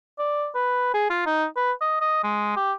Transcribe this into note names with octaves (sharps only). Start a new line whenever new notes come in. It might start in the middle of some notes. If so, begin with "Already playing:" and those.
D5
B4
G#4
F4
D#4
B4
D#5
D#5
G#3
G4